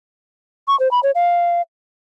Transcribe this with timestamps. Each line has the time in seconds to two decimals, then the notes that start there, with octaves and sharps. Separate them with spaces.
0.68 C#6
0.79 C5
0.91 B5
1.03 C#5
1.15 F5